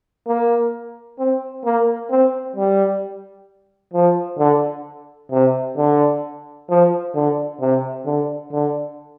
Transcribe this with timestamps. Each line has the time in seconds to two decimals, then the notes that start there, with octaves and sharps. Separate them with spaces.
0.27 A#3
1.19 C4
1.65 A#3
2.10 C4
2.56 G3
3.94 F3
4.39 D3
5.31 C3
5.77 D3
6.69 F3
7.15 D3
7.61 C3
8.06 D3
8.52 D3